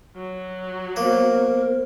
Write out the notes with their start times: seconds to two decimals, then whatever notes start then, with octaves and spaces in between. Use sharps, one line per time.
0.16 F#3
0.96 A#3 B3 A#4 C5